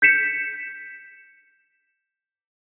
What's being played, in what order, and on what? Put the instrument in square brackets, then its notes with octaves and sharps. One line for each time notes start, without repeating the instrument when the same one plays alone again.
[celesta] G6 B6 C#7 E7